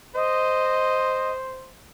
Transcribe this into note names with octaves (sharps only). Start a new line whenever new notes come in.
C5 D#5